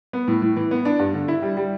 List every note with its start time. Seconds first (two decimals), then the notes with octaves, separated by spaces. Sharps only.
0.13 B3
0.28 A2
0.42 A2
0.56 E3
0.71 B3
0.85 D4
0.99 G2
1.14 D3
1.28 E4
1.42 G3
1.57 G3